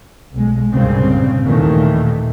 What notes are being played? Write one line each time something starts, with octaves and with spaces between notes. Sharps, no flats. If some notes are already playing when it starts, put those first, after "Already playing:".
B1 G#3
C2 G2 A#2 C#3 C4
D#2 A#2 D#3 E3 A3